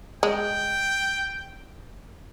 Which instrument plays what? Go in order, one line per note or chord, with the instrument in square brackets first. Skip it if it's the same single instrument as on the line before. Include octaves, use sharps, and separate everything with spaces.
[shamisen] G#3 [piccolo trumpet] G5